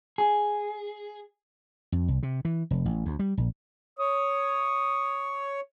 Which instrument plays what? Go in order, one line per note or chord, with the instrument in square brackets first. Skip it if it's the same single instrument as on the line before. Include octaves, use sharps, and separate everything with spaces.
[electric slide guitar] G#4
[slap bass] F2
C2
C3
E3
F1
A1
D2
G3
A#1
[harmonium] C#5 [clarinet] D#6